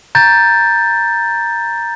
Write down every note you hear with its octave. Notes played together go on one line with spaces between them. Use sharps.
A#5 G6 A6